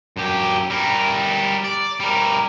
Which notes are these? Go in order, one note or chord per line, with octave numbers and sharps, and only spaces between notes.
F#2 G4
G3 A#4
D5
G3 A#4